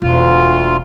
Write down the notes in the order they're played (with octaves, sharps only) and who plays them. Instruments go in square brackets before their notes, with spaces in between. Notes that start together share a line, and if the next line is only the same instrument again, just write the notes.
[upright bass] E1 [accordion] D2 F4